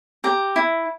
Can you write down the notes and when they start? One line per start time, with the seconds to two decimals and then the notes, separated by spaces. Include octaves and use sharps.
0.24 G4 A#5
0.56 E4